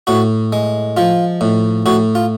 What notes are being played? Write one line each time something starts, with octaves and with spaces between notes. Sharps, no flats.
A2 F#4
G#3
F3 F4
A2
A2 F#4
F4